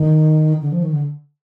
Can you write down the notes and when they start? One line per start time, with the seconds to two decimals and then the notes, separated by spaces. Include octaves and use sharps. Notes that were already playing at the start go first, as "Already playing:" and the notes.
Already playing: D#3
0.62 D3
0.72 F3
0.83 D#3
0.93 D3